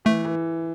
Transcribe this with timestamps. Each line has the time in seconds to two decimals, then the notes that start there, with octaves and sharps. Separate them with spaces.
0.05 E3 A3
0.24 E3